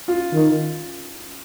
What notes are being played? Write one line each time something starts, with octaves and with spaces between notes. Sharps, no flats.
F4
D#3